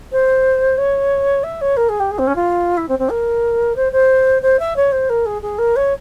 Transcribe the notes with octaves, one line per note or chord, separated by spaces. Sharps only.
C5
C#5
E5
C#5
A#4
G#4
G4
G#4
C4
C#4
F4
E4
C4
C4
A#4
C5
C5
C5
E5
C#5
C5
A#4
G#4
G#4
A#4
C#5